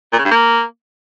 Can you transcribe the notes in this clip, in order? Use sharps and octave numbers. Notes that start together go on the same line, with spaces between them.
A#2
C#3
G2
A#3